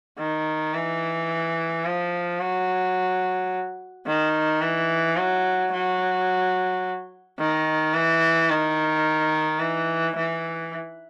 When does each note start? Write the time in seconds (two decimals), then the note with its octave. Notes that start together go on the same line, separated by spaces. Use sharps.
0.18 D#3
0.74 E3
1.85 F3
2.40 F#3
4.07 D#3
4.62 E3
5.17 F#3
5.73 F#3
7.39 D#3
7.94 E3
8.50 D#3
9.60 E3
10.16 E3